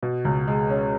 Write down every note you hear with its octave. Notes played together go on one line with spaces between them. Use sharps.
B2
C#2
G#3
C#4